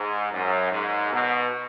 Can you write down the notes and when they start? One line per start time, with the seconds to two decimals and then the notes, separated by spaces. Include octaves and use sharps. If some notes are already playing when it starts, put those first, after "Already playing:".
Already playing: G#2
0.32 F#2
0.72 G#2
1.12 B2